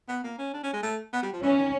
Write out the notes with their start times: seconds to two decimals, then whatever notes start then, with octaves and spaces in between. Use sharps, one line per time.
0.08 B3
0.23 A#3
0.38 C#4
0.53 D4
0.63 C#4
0.73 G#3
0.83 A3
1.13 B3
1.22 G3
1.33 F3
1.42 E3 C#4
1.58 D#3